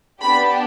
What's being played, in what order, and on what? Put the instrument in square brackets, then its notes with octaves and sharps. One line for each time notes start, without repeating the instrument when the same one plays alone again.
[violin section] B3 D4 G4 B5